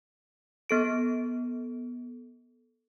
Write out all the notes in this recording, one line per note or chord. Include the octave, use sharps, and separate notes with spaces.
B3 A4 D7